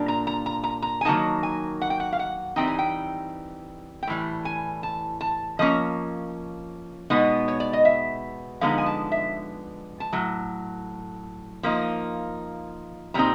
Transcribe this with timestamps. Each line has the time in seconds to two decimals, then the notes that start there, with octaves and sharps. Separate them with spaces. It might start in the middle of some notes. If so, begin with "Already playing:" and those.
Already playing: A#2 G3 A#3 D4
0.08 A#5
0.27 A#5
0.46 A#5
0.63 A#5
0.82 A#5
1.01 G#5
1.05 D#3 F#3 A#3 D#4 A5
1.43 G#5
1.81 F#5
1.90 G5
2.00 F#5
2.13 F5
2.19 F#5
2.56 E3 G3 C4 D#4 G5
2.67 G#5
2.79 G5
4.03 G5
4.07 A2 E3 G3
4.45 G#5
4.83 A5
5.21 A5
5.59 F3 A#3 C#4 D#5
7.10 B2 G#3 B3 D#4
7.48 C#5
7.60 D5
7.73 D#5
7.85 E5
8.61 D3 F3 G#3 B3 D#4 F5
8.78 G#5
8.86 A5
9.12 E5
10.00 A5
10.13 A2 F#3
11.63 F3 A#3 D#4
13.14 A#2 G3 C4 D#4 A#5